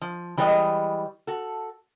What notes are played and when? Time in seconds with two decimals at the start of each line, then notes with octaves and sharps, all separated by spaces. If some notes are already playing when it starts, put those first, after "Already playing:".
0.01 F3
0.37 E3 G3 G#3 C5 C#5 D#5
1.27 F#4 A4